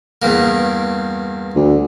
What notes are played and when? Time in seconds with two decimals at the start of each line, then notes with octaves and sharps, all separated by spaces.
0.22 E2 G2 A#3
1.55 D2